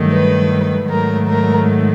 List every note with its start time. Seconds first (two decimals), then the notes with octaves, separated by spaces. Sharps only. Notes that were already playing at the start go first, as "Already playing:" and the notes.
Already playing: G2 D#3 F#3 A3
0.13 B4
0.90 G#2 D#3 F#3 A3 A#4
1.28 A#4